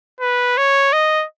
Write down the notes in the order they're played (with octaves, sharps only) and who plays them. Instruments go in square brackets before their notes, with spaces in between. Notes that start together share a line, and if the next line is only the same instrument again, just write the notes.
[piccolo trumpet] B4
C#5
D#5